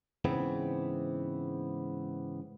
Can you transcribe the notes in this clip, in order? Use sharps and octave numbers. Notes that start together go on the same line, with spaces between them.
G#2 C#3 E3 B3 C4